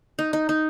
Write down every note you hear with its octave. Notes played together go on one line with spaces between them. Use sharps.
D#4
D#4
D#4